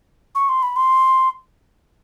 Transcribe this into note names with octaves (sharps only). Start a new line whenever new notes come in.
C#6
C6
B5
C6